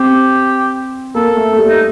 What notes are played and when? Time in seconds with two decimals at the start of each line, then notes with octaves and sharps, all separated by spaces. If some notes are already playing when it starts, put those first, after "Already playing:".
Already playing: C4 G4
1.15 A#3 A4
1.37 A3
1.53 A3
1.58 G3
1.69 D#4